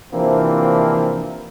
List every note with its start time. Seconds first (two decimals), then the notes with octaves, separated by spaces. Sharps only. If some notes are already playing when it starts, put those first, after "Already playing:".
0.13 C3 E3 F3 A#3 C4 D4